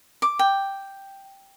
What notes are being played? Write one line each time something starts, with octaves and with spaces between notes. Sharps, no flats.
D6
G5